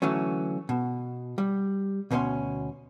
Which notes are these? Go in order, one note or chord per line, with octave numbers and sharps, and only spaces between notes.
D3 E3 F#3 A3 C#4
B2
G3
D2 B2 B3 C#4 C#5 C6